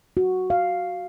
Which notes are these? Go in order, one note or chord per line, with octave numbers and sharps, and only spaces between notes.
F#4
F5